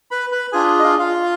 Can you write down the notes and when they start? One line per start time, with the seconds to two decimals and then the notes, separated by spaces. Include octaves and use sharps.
0.11 B4 B5
0.32 B4 B5
0.52 D4 F4 G#4 G#5
0.79 D#5
0.84 F4 F5
0.99 F4 F5